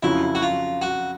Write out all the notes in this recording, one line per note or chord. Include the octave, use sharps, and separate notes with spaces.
F2 C#3 F#3 E4
F#4
F4
F#4